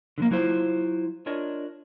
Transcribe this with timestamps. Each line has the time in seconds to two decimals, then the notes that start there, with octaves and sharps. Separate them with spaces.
0.18 D3 F3 A#3
0.31 F#3 E4 F4 C5
1.26 D4 F4 A#4 C#5 D#5